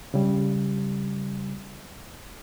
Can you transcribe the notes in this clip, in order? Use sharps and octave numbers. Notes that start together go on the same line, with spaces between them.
C#3 G3